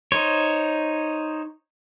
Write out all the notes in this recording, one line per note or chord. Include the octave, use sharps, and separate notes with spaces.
D#4 C5 C#5